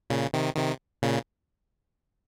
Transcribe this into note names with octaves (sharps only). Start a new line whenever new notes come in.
A#2 C#3
C3 D#3
C3 D#3
A#2 C#3